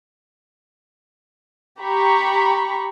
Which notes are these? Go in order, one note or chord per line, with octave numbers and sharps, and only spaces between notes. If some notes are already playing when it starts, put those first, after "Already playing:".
G4 A#5 B5 C#6